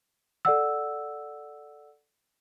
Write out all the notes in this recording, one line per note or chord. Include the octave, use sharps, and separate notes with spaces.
A4 D5 F#5 E6